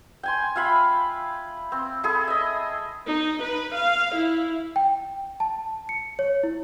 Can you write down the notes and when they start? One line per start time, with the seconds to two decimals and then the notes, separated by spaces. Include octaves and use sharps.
0.23 G5 G#5 C6
0.56 F4 E5 F5 B5
1.72 C4
2.03 E4 G#4 A4
2.28 D#5 E5
3.06 D#4
3.41 B4
3.75 F5
4.15 E4
4.76 G5
5.40 A5
5.89 C#7
6.19 C#5
6.43 E4